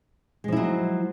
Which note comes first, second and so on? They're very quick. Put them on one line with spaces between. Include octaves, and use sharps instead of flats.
G#3 F3 E4 F#3